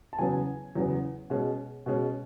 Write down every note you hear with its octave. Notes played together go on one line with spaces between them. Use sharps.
A5
E2 C#3 F#3 B3 G#5
E2 C#3 F#3 B3
B2 G#3 C#4
B2 G#3 C#4